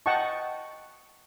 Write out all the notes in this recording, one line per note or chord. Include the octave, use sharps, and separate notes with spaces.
D#5 F#5 G5 A5 C#6